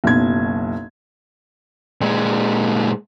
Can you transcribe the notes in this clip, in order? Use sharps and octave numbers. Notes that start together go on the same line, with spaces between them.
F#1 B1 B2 G#6
A#2 G#3